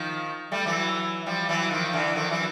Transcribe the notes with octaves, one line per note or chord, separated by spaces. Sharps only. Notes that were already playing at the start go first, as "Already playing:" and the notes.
Already playing: D#3 F3
G3 A3
E3 F#3
F3 G3
E3 F#3
D#3 F3
D3 E3
D#3 F3
E3 F#3